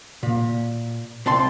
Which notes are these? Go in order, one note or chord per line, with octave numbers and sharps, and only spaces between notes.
A#2
C2 C4 A5 C6